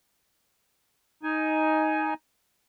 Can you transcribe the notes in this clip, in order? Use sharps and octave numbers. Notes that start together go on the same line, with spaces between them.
D#4 G#5